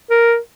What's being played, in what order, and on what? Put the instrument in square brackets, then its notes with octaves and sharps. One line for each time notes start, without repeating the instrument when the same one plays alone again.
[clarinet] A#4